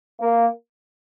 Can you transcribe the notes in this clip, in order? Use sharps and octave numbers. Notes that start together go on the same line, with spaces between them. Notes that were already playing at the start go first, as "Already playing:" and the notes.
A#3